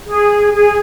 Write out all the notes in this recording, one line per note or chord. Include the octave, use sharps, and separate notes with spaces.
G#4
G#4